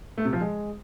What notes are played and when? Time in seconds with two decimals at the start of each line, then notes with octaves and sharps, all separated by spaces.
0.18 A3
0.25 C3
0.33 F3
0.40 G#3